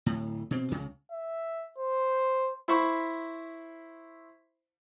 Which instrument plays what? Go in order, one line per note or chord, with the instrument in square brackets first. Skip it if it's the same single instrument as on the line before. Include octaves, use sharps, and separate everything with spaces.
[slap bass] D1 A2
B2 C4
C#2 C#3
[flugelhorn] E5
C5
[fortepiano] E4 C5 B5 C#6